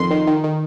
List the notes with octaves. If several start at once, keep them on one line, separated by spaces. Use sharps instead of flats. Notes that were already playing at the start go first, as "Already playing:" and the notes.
Already playing: F2 D#3 C6
D#3
D#3
D#3